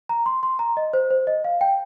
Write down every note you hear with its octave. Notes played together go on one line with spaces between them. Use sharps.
A#5
C6
C6
A#5
D#5
C5
C5
D#5
F5
G5